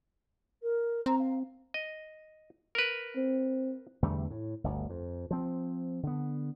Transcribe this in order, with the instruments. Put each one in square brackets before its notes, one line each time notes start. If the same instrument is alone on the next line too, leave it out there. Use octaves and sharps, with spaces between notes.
[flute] A#4
[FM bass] C4 [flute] A#5
[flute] F5
[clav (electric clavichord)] D#5
A#4 B4
[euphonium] C4
[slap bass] E2 D3 G3 A3
A2
G1 D2
F2
F3 C4
D3 B3